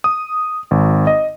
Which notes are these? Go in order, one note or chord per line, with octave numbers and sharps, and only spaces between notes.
D#6
G#1
D#5